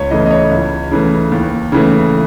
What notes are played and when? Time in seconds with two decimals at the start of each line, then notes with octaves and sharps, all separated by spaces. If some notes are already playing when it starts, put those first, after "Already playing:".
Already playing: C#2 C#5
0.11 C#3 E3 A3 D#5
0.26 D#5
0.31 C#5
0.51 C#2
0.91 C#3 E3 A3
1.32 D#2
1.72 C#3 E3 A3